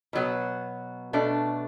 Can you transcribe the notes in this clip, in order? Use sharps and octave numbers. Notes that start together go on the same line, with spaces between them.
B2 F#3 B3
B2 A3 D4